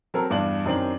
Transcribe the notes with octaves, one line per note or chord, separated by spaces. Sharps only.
F#3 C4 A4 A#4
E2 G2 D4 F#7
F#2 D#3 C4 D4 F#7